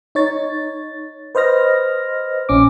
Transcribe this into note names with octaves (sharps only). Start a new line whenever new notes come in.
D#4 C#5 A6
B4 C5 D#5 F6 A#6
A#1 C#4 D6